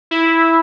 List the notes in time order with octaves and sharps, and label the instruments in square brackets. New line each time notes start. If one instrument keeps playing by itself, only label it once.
[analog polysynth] E4